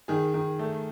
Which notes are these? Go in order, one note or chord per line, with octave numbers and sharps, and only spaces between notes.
D#3 G#4
D#3
A3